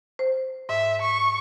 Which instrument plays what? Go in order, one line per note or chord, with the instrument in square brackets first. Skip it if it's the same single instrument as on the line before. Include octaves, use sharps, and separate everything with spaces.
[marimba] C5
[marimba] G#2 [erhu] E5
[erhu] C#6